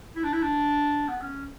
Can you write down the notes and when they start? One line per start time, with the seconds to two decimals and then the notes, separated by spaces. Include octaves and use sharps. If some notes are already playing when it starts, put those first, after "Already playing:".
0.16 E4
0.24 D4
0.33 E4
0.42 D4
1.08 B3
1.22 C#4